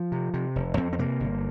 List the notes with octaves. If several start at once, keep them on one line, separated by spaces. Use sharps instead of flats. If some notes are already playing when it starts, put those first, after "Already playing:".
Already playing: F3
C3
C3
F1
F2 C4
C4
C3 A#3
G1